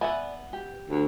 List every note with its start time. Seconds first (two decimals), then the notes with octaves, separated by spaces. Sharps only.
0.01 B3 D5 E5 F#5 G#5
0.53 G4
0.90 D2